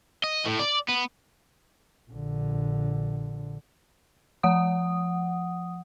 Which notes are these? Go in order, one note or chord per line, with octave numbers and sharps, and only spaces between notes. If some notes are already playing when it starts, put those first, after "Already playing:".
D#5
A2
D5
B3
A#1 D3
F3 F#5 D#6